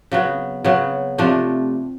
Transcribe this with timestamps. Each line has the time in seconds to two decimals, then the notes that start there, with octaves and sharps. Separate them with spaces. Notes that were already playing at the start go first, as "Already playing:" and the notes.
0.11 C#3 F#3 B3
0.64 C#3 F#3 B3
1.18 C3 F3 A3 D4